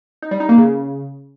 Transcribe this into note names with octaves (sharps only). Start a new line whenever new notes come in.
D#4
G3
D#4
A#3
C#3